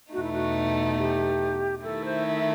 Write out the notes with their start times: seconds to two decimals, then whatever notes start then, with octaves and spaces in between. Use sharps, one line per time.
0.13 E2 B2 A3 D#4 F#4
0.23 E4
0.33 F#4
0.98 G4
1.83 D#3 A3 E4 A4
2.05 C5
2.26 E5